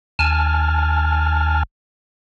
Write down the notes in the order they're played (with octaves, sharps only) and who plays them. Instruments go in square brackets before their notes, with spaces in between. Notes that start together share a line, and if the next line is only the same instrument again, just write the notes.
[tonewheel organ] D#2 G#5 A5 F6